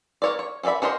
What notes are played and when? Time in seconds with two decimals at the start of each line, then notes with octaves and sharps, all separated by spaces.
0.22 A#4 C#5 D5
0.39 C#5
0.63 C#4 A4 D5 E5 B5
0.82 C#4 D4 A#4 C5 D#5